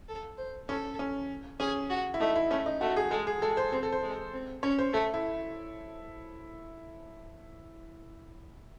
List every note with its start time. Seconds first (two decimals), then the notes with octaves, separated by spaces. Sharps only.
0.09 A4
0.38 C5
0.69 C#4 A4
0.99 C#4
1.60 C#4 G#4
1.90 F#4
2.14 E4
2.20 A3 D#4
2.36 E4
2.50 A3 C#4
2.66 D#4
2.81 A3 F#4
2.96 G#4
3.11 G#3 A4
3.27 G#4
3.42 G#3 A4
3.57 C5
3.72 C4 C5
3.83 A4
3.92 C5
4.03 G#3
4.33 C4
4.63 C#4 C#5
4.79 C5
4.93 A3 A4
5.14 E4